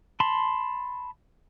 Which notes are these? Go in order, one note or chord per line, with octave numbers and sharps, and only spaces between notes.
A5 B5 C6